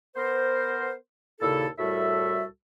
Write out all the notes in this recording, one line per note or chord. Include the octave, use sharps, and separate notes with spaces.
B3 A#4 C5
D#2 A#2 C#3 E4 A4
C2 A2 G3 F#4 A4 E5